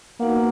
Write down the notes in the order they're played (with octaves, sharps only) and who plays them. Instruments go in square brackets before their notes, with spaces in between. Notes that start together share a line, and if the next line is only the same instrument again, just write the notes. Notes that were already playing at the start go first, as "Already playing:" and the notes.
[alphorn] A#3 [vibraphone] B3 D#4 F#4 B4 F#5